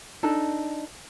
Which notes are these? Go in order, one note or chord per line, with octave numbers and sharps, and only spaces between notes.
D4 D#4 A4